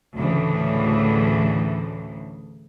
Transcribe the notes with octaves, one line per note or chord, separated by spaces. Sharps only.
D2 A2 C#3 E3